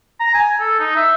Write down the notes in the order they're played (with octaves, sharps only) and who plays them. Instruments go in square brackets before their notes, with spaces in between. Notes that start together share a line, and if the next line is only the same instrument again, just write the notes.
[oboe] A#5
G#5
A4
D#4
E5